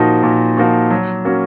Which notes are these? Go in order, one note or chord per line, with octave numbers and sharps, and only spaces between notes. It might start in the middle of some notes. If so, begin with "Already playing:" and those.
Already playing: A#2 F3 A#3 D#4 F#4
A#2
F3 A#3 D#4 F#4
F#3
A#3 C#4 F#4